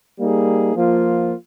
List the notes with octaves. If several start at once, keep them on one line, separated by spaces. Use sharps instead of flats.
G3 A#3 D#4 G#4
F3 A#3 F4